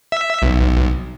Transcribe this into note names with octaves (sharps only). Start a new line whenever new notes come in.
E5
B1